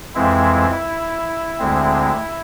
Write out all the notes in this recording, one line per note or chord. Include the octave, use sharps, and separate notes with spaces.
F2 E3 G#3 C4 E4
D2 D3 G#3 C4